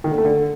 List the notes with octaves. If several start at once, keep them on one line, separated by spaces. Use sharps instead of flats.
D#3
D3
A3
D3